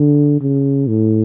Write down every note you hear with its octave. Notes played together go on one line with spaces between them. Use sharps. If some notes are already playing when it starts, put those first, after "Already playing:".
Already playing: D3
C#3
A2